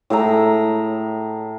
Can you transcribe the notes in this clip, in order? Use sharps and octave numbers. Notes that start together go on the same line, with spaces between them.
A2 G#4 E5 A#5